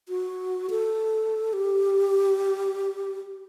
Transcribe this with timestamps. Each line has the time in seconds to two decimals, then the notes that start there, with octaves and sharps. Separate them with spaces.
0.09 F#4
0.70 A4
1.53 G4